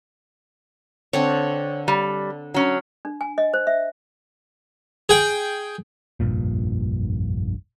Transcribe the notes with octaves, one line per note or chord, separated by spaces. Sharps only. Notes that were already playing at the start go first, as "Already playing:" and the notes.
D3 C4 D4 C#5
G3
F#3 C#4
D4
G#5
D#5
C5
E5
G#4 G5
F1 A#1 G2 A#2